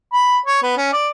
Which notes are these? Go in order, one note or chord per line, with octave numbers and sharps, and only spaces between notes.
B5
C#5
B3
C#4
D5